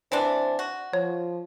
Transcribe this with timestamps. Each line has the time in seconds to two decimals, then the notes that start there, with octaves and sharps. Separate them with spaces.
0.12 E3 C4 D4 C5
0.59 F#4
0.93 F3 C#5